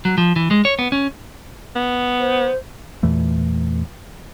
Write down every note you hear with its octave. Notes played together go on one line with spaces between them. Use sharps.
F#3
F3
E3
G#3
C#5
B3
C#4
B3
C5
E2 A#2 E3 A3